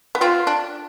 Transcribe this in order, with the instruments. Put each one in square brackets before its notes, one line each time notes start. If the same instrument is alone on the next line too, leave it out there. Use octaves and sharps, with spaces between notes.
[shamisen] B3
[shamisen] C4 [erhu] F4
[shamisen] D4